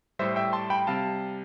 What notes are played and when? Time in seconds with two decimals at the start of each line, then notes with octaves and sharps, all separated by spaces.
0.19 A2 G3 C5 E5
0.36 E5 G5
0.53 A5 C6
0.70 G5 B5
0.87 C3 G3 F5 A5